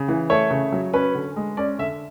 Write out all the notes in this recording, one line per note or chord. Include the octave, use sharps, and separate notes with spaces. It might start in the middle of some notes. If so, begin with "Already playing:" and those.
Already playing: C#3
E3
A3 C#5
C#3
F#3
C#4 B4
D3
G#3
C#4 D5
D3 E5